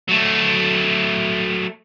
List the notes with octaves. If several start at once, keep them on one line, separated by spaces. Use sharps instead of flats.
F#3 A3